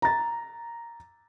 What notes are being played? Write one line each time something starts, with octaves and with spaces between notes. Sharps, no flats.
A#5 A6